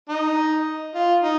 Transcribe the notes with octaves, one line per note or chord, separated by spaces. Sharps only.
D#4
F4
D#4